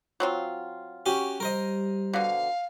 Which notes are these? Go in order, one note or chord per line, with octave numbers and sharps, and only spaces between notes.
F#3 C4 F4
C#4 F#4 G4
G3 A#4 C5 D#5
B2 D3 F5